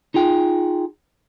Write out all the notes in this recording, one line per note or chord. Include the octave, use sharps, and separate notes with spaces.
D#4 F4 G#4 G5